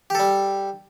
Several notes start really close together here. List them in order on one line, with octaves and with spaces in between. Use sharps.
G4 A4 G3